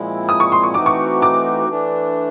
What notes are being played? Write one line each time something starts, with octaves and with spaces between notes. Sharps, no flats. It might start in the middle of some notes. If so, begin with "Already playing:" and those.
Already playing: A#2 F3 G#3 C4 E4
D#6
C#6
C6
C#6
E3 A3 C4 D#4 F#4 D6
C#6
D6
E3 A3 D4